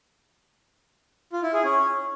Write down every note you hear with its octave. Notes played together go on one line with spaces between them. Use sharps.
F4
E4
G#4
C#4